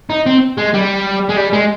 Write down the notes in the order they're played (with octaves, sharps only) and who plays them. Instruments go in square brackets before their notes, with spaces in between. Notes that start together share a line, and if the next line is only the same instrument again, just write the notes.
[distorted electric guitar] D#4
C4
G#3
G3
G#3
G3
G#3